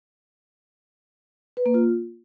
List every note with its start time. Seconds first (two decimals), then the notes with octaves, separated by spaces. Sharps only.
1.57 B4
1.66 A#3
1.74 F4